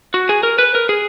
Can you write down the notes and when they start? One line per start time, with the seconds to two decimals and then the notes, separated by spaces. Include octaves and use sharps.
0.14 F#4
0.29 G#4
0.43 A#4
0.59 B4
0.75 A#4
0.89 G#4